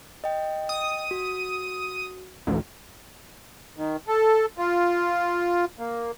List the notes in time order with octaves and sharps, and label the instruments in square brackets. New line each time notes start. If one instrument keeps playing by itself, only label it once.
[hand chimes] D#5 G5
[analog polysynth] D#6
[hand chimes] F#4
[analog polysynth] A1 D2
[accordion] D#3
A4
F4
A#3